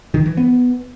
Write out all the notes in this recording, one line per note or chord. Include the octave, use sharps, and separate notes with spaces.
D#3
E3
B3